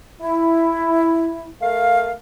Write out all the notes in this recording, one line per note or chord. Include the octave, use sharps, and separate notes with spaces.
E4
A3 A#4 F5